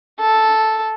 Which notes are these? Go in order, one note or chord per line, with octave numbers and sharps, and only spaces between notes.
A4